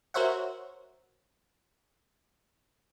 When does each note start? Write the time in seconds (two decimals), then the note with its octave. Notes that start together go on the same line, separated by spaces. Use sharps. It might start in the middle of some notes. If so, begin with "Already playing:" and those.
0.14 F#4 A#4 C5 C#5 E5 F#5